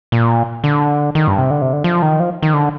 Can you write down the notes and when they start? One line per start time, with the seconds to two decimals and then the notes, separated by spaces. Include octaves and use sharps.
0.12 A#2
0.64 D3
1.15 D#3
1.28 G2
1.38 C3
1.50 D3
1.62 C3
1.73 D3
1.84 F3
2.02 D#3
2.20 F3
2.42 D#3
2.54 D3